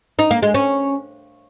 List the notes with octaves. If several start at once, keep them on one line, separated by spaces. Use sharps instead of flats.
D#4
A#3
G#3
C#4